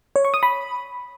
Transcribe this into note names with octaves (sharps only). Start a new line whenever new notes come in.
C#5
C#6
D#6
B5